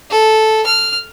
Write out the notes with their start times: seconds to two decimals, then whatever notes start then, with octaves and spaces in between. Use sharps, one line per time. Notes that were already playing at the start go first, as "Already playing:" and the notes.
0.11 A4
0.66 F6